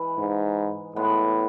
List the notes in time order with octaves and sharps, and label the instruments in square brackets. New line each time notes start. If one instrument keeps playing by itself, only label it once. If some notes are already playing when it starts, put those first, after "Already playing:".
Already playing: [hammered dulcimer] E3 G#3
[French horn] G#2
[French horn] A2 [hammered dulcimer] G#3 B3